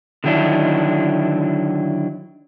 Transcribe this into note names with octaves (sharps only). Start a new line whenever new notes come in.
D3 D#3 F#3 D4 E4